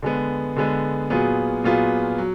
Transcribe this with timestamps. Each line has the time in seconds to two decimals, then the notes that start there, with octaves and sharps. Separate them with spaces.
0.02 D3 G#3 B3
0.56 D3 G#3 B3
1.10 A#2 F#3 B3 F4 G#4
1.64 A#2 F#3 B3 F4 G#4
2.18 F#3